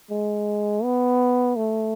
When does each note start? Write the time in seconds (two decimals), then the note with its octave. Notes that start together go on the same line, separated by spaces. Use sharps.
0.11 G#3
0.83 B3
1.56 A3